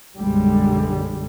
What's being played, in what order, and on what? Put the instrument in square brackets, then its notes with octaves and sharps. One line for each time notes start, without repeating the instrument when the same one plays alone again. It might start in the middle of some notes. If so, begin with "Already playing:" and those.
[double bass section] B1 F#2 D3 G3 G#3